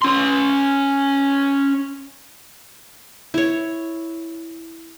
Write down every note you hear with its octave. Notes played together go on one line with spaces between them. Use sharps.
C#4 C6
E4 C#5